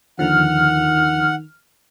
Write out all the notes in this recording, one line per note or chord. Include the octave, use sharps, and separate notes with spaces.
D#2 D3 D#3 F3 F#5 F6